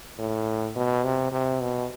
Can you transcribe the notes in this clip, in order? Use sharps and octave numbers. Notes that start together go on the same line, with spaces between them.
A2
B2
C3
C3
B2